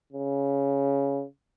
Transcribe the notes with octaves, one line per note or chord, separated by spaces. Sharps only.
C#3